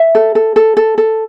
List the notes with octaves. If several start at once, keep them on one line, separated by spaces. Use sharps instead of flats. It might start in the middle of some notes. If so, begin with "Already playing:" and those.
Already playing: E5
A4
A4
A4
A4
A4